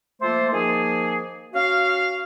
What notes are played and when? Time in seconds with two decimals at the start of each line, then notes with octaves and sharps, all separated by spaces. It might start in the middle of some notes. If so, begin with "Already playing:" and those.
0.21 F3 A3 A#3 A4 C5
0.52 D#3 F3 A#3 G#4
1.54 C#4 F#4 F5